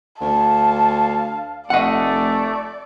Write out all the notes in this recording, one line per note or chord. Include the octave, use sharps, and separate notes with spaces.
D2 F5 A5
F1 A3 D5 D#5 F#5